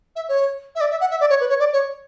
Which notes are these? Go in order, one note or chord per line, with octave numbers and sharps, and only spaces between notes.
E5
C#5
E5
D5
E5
F#5
E5
D5
C#5
B4
C#5
D5
C#5